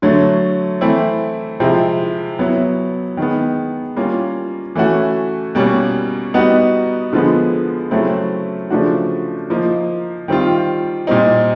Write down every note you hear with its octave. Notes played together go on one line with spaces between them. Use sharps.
D3 F#3 A3
E3 A3 C4 E4
C3 F3 G#3 C4 E4
F#3 B3 E4
D#3 G#3 B3
G3 A#3 C#4 F4
E3 A3 C#4 F#4
B2 G3 A#3 C#4
G3 B3 D#4 F#4
D3 F3 G#3 B3
C#3 F#3 A3 C4 E4
C#3 F3 A3 D4 F#4
F3 A#3 D#4
D#3 G3 C4 F4
A#2 G3 C4 D#4